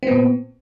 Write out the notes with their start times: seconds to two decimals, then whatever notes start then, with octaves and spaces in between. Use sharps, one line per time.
0.03 C4
0.07 B3
0.11 A#2